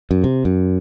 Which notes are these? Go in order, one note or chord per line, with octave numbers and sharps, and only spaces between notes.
F#2
C3
F#2